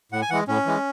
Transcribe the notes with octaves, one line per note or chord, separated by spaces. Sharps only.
A2 F#5
G#5
E3 G#3 F#5
A2 C#4
E3 G#3